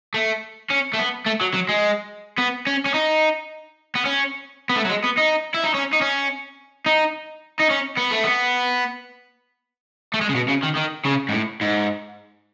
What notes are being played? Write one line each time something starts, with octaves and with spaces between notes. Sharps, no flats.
A3
C#4
A3
B3
A3
F#3
F#3
G#3
B3
C#4
C#4
D#4
B3
C#4
B3
A3
F#3
G#3
B3
D#4
E4
D#4
C#4
D#4
C#4
D#4
D#4
C#4
B3
A3
B3
A3
G#3
C#3
B2
C#3
D#3
D#3
C#3
G#2
A2
G#2